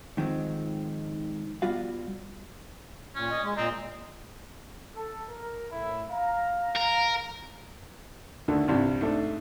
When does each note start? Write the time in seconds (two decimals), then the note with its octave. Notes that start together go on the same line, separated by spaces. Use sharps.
0.17 G#2 D#3 F3 G#3 C4
1.62 G3 B3 F4 F#4 F5
3.15 A#2 C#4
3.31 D#5
3.43 G#3
3.57 A#2 C4 D#5 A#5
4.96 A4
5.29 A#4
5.72 A2 E4
6.11 F5 A#5
6.76 A#4
8.48 D2 D3 D#3 A3
8.68 C2 G2 C3
9.01 G#2 A3 D4